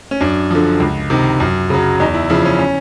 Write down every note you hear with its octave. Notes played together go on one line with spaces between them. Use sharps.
C#4
F#2 D4
D3 F3
C#2
C3 D#3
F#2
C#3 F#3
E2 D#4
E4
C#3 F3 E4
C#4
C#4